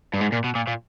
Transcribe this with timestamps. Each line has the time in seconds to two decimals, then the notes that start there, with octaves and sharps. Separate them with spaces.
0.14 G2
0.21 G#2
0.32 A#2
0.44 B2
0.55 A#2
0.67 A#2